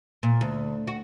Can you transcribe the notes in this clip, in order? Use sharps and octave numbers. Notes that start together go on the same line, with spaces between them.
A#2
D2
F#4